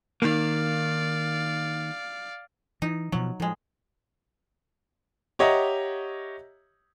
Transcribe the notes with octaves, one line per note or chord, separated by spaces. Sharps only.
D#3 A#3 D5 F5
E3 D#4
B2 F3 F#3
A2 F3 G#3
G4 C#5 D#5 E5 F#5 A#5